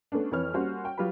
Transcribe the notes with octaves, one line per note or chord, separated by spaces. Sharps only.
A3 B3 C#4 D4
F2 E3 B4 C#5 F6
G3 A#3 C#4 F#4 C5
G5
F#3 F4 G4 B4 B5